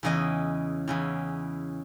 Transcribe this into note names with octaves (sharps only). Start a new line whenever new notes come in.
E2 C#3 E3 D#5
E2 C#3 E3